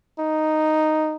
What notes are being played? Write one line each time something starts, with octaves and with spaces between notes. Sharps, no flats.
D#4